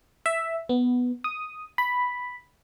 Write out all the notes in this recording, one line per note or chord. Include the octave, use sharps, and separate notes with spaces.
E5
B3
D#6
B5